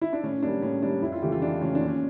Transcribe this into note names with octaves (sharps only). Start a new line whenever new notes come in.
E4
D4
A2 C#4
G3 A#3 D4
A2 C#4
G3 A#3 D4
F2 E4
F4
C#3 E3 A3 G4
F4
F2 D4
C#3 E3 A3 C#4
D4
A#2
C#4